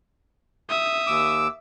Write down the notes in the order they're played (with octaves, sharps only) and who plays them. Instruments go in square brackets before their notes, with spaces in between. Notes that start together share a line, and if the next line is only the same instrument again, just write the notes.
[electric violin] E5 D#6
[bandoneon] D#2 D6 E6